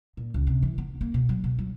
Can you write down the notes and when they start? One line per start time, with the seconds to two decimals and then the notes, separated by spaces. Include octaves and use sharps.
0.17 A#2
0.34 C#2
0.47 C3
0.63 E3
0.78 B3
1.01 A#3
1.14 B2
1.29 F#3
1.44 B2
1.59 F#3